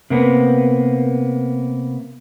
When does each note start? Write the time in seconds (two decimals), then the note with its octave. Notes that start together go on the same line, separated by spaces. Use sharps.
0.10 C3 A#3 B3